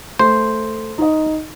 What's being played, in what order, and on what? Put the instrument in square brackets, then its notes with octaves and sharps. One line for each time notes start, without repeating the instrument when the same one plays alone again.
[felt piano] A3 [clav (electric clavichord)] C5
[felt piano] D#4 D#5